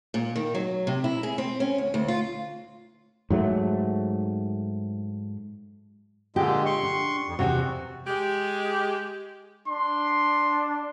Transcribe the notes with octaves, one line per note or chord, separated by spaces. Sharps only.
A#2
D#3
F#3
C3
E4
G#4
C4
C#4
D2
D2
F4
G#2 F#3 A3
A#2 D3 G#3 G4
C6 C#6
D4
F2
E2 G#2 C3 F#4
G#3 G4
D4 C6